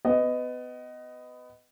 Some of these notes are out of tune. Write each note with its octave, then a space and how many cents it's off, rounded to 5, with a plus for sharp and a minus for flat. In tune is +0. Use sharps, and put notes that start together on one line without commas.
B3 +25 D#5 +0